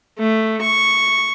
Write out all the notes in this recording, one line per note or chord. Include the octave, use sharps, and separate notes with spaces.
A3
C#6